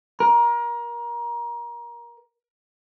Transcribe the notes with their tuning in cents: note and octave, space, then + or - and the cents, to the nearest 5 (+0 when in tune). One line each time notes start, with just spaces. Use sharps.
A#4 +25